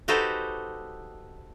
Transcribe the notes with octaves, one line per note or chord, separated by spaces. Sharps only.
D#4 F#4 G4 A4 B4 C5